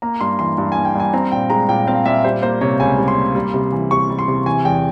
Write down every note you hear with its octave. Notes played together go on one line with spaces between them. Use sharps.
A#3 A#5
G2 C6
E3 C6
G2
A#3 G#5
G5
G2 G#5
C4 A#5
A#2 G5
G#3 A#5
A#2 G5
C4 F5
A#2 E5
G3 C5
A#3 C5
C3 C#5
C#2 G#5
G3
C6
A#3
G3
C3
E3
C3 C#6
G3
C6
C3
E3 G#5
E2 G5